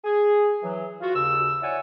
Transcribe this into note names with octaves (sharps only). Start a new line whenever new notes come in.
G#4
E3 F#3
F4 F#4
D#2 C#3 E6
E4 C#5 D5 F#5 G#5